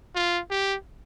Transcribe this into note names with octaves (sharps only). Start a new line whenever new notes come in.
F4
G4